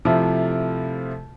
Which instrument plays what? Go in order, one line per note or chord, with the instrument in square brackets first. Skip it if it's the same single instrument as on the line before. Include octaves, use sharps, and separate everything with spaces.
[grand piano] C3 F3 A3 E4 F4